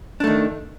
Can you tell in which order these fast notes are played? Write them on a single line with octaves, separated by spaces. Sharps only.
D4 A3 D#3